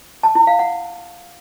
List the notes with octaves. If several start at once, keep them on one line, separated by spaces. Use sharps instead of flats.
A5
E4
F5
F#5